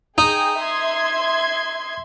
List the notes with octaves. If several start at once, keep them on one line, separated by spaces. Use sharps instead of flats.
D#4 G#4 G5
E5 C6 G#6